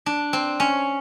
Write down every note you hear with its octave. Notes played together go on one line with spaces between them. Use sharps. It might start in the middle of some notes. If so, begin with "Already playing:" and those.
D4
C4
C#4